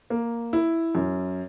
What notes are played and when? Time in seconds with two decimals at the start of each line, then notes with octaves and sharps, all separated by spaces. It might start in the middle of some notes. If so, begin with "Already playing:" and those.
0.10 A#3
0.53 E4
0.95 F#2